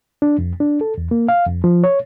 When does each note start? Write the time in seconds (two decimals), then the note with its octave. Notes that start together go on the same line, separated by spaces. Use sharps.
0.22 D4
0.38 F2
0.60 D4
0.81 A4
0.98 E2
1.11 A#3
1.29 F5
1.46 F2
1.64 F3
1.83 C#5